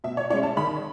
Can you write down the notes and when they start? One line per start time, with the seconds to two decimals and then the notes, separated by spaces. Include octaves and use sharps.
0.04 B2 E5
0.17 C#5
0.30 G#3 C#4 E4 C#5
0.43 A5
0.57 D#3 B5